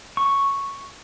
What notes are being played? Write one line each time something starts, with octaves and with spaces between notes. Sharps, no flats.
C#6